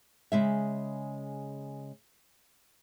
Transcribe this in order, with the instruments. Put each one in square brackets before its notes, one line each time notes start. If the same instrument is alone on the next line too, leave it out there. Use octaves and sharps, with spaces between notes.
[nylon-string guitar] C#3 G#3 E5